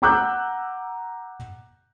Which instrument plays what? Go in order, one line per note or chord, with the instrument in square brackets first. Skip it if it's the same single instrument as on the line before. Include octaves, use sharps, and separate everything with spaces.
[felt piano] F#5 A#5 D6 E6 F#6 G6